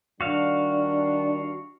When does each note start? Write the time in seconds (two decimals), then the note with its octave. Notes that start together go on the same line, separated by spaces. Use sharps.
0.21 D#3 G3 D4 F#4 F5